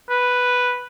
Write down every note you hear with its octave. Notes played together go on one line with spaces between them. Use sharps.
B4